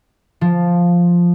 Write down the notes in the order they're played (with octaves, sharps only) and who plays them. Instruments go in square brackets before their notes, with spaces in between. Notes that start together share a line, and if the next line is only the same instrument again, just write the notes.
[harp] F3